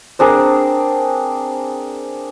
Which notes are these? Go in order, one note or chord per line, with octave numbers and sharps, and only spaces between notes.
C4 D4 G#4 A#4